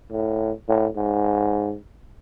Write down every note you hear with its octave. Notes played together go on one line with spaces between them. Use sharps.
A2
A2
G#2